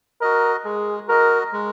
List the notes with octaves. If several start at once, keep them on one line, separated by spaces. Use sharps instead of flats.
F#4 A#4 D#5
G#3 G#4
F#4 A#4 D#5
G#3